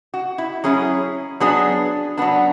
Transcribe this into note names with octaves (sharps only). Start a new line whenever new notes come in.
F#4
E4
F#3 C#4 E4 G#4
F#3 B3 D4 G#4
F#3 B3 D4